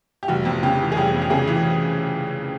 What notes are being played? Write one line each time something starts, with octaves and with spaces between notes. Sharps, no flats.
G4
F1 F#4
F2
C#3 G4
E3
G#4
F1 G4
F2
G4
C#3 G#4
E3